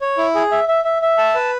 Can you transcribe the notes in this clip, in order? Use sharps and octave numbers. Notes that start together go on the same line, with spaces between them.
C#5
E4
G#4
E5
E5
E5
E5
A5
B4